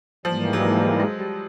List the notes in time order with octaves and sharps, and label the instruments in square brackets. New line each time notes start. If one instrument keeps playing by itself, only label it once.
[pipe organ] G#2 E3 G3 A#3 [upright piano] F3
[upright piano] F#3
G#3
G3